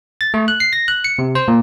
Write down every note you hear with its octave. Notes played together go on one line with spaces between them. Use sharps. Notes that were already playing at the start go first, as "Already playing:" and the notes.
A6
A3
F#6
C7
A#6
F#6
C#7
C3
C5
A#2